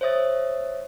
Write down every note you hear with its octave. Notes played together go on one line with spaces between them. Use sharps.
C5 C#5 E5 D#6 A6